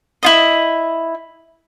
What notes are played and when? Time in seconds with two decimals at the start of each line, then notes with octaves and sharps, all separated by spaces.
0.23 E4 F4 D#5